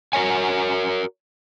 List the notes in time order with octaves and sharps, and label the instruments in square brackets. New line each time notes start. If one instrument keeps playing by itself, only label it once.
[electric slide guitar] F#4 A#4 C#5 G#5